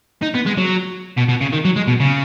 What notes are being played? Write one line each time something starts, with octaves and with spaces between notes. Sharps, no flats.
D#4
B3
G#3
F#3
B2
B2
C#3
D#3
F#3
G#3
B2
C#3